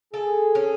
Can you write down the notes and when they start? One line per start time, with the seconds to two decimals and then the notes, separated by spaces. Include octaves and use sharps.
0.13 G#4 A4
0.55 C#4